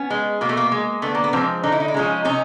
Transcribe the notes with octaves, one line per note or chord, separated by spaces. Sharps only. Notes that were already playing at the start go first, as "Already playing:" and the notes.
Already playing: B3 C#4
G#3
B2 A#3
A3
A#3
G#3
D3 A3 B3
A#3
B3
F3 G#3 A#3 C4
D3 D#4
E4
D#4
E4
F3 G#3 C#4 D#4
C3 C#4 D#4